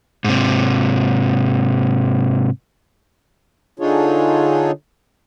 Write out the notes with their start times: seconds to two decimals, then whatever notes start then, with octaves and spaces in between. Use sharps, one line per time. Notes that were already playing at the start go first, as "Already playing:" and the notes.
0.24 G#2 C3
3.79 D3 D4 D#4 F4 G#4 C#5